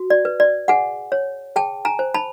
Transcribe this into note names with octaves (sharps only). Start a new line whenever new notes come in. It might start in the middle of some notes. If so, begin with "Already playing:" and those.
Already playing: F#4
D5
B4
D5
G#4 F#5 G#5
C#5
G#4 G5 A5
G#5 A#5
C5
A5 B5